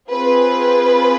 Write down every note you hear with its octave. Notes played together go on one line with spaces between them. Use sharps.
C4 F4 G#4 B4